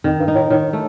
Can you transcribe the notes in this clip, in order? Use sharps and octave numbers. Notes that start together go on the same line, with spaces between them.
F2 D#3
G2
D#4
A2
A2 D#3
A3